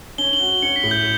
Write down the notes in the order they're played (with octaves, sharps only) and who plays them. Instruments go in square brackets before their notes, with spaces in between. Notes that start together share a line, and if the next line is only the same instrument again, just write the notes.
[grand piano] C#4 [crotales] G7
[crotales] F#7
[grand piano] F#4
[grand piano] C#4 [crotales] C#7
[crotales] B6
[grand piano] A2
[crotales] G6